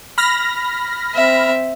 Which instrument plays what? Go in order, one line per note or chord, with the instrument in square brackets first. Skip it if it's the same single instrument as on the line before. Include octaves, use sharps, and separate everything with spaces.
[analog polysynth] B5 F6 A#6
[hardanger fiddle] C4 E5